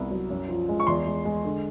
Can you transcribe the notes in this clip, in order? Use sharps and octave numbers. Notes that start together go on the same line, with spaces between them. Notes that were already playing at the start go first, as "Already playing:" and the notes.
Already playing: C2 B3
F#3
F#2
F3
G#3
C#6
E2 C6
G#3
G#3
D3